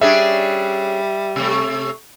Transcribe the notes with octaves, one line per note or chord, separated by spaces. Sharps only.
G3 C#4 D4 G#4 E5
C3 A3